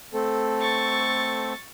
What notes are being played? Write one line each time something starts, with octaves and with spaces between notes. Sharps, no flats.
A3 C4 A4
C#6 A6